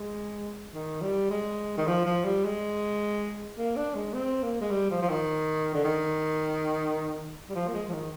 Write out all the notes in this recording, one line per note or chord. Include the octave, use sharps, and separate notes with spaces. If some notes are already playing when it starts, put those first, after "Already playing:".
Already playing: G#3
D#3
G3
G#3
D#3
F3
F3
G3
G#3
A#3
D4
G#3
C4
A#3
G#3
G3
F3
F3
D#3
D3
D#3
G3
F3
A#3
G#3
F3
D#3